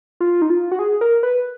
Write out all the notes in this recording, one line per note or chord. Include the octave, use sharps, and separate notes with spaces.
F4
D#4
F4
F#4
G#4
A#4
B4